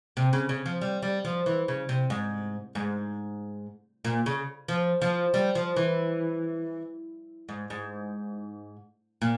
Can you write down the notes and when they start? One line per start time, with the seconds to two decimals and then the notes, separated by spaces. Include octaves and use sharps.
0.17 C3
0.33 C#3
0.49 C#3
0.66 F3
0.81 G3
1.02 G3
1.25 F3
1.46 E3
1.68 C#3
1.89 C3
2.10 G#2
2.75 G#2
4.05 A#2
4.26 C#3
4.68 F3
5.02 F3
5.34 G3
5.55 F3
5.76 E3
7.49 G#2
7.70 G#2
9.22 A#2